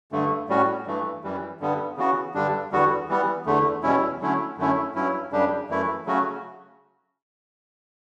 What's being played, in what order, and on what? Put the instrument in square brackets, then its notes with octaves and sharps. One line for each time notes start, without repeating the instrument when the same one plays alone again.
[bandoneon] G2 D3 A3
A2 G3 C#4 F#4
G2 E3 A3
F#2 E3 G3
G2 D3 G3 B3
C#3 E3 B3 F#4
G2 D3 G3 D4
E2 D3 G3 B3 F#4
E3 G3 B3
E2 D3 A3
E2 B2 G3 C#4 E4
D3 F#3 A3 C#4 E4
F#2 D3 A3 C#4 E4
G2 F#3 C#4 E4
F#2 C#3 G3 D4 G4
F#2 E3 A3 E4
C#3 F#3 A3 C#4 F#4